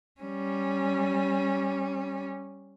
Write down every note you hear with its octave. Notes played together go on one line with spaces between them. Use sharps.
G3 C#4